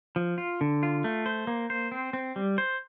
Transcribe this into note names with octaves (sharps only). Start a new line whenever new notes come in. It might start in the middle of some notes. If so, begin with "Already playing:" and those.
F3
F4
D3
F4
A3
C5
A#3
C5
C4
C4
G3
C5